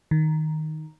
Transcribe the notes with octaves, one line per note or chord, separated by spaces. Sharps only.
D#3